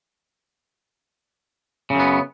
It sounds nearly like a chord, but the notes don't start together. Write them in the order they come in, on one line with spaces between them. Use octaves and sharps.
C#3 F#2 B3